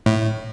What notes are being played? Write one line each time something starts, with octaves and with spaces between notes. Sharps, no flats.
A2